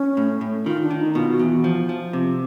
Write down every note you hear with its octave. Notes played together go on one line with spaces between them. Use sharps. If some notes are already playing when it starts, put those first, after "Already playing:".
Already playing: C#4
A2
A2
D#3 F4
D4
D#3
D#4
B2 F4
F#4
E2
F3
F3
C3